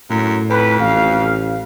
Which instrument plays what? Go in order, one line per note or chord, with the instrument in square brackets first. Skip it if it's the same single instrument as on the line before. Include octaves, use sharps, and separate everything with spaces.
[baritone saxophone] F#2 [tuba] A2
[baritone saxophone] F2 [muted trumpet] B4
[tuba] A1 [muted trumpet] F5